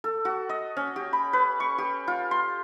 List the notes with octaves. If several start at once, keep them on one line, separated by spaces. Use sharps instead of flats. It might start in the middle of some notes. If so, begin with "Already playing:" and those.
A4
F#4
D#5
C#4
G4
B5
B4
C#6
G4
F4
C6